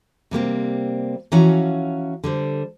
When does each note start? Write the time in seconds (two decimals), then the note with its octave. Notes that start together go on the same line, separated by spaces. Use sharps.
0.31 C3 G3 A#3 C4
1.32 E3 F3 C#4 F#4 F5 A#5
2.24 D3 G3 C5